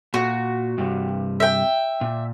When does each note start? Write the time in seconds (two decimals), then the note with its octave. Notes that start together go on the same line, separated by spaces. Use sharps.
0.14 A#2 F#4
0.78 G2 C3
1.40 E5 G5
2.01 A#2